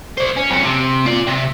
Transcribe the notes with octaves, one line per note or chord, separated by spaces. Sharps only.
C5 D5
C#4
F2 C#4
C3
F4 D5
C3